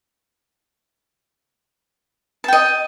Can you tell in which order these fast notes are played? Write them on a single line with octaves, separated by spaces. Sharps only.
A5 G5 D#5